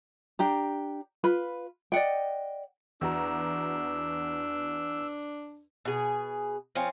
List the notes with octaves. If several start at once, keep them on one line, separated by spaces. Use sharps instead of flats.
D4 G4 A#5
F4 B4 B5
D5 D#5 F#5 G5
E2 D4 F#4 A#5 E6
B2 G#4
F3 C4 C#4